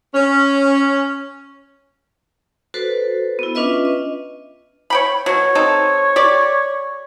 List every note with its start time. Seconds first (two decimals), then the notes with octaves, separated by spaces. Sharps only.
0.15 C#4
2.74 F#4 A4 B4 C5
3.39 B3 E4
3.55 C#4 D4 F4 B4 D#5 E5
3.85 D#5
4.90 C#5 G5 B5
5.26 B2 F#3 C#5
5.55 C4 D#4 A4
6.16 G4 D5